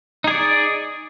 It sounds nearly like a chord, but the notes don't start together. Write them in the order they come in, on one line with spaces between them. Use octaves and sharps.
D#4 G#4 D5